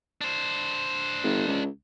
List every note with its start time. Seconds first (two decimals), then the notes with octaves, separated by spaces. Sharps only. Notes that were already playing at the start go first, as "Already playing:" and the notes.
0.21 D4 C5
1.24 G1
1.48 C#2